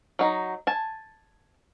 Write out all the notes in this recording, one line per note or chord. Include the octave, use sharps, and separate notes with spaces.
F#3 D#4
G#5 A5